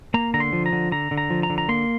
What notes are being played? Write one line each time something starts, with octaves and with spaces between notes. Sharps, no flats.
A#3 A#5
D3 A#5
C6
F3
A#5
D3
D3 A#5
D3
A#5
F3
A#5
D3
A#5
A#3 C6